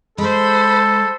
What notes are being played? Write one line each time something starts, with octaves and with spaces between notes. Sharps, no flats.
G#3 A4 C5 B5